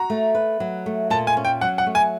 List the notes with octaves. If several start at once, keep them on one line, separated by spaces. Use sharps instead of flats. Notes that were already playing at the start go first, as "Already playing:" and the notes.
Already playing: F#4 A#5
A3
B4
F#3
A3
A#2 A5
G#5
C#4
G5
F#3 F#5
F#5
A3
G#5